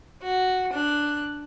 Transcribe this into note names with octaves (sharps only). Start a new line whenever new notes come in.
F#4
D4 F#6